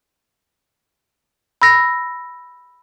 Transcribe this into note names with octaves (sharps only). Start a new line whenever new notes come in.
B5 E6 A#6